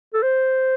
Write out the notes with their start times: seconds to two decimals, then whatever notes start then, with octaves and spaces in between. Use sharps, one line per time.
0.14 A4
0.23 C5